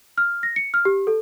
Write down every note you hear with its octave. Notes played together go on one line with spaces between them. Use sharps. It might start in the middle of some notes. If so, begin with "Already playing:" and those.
F6
A#6
C#7
F6
G4
A4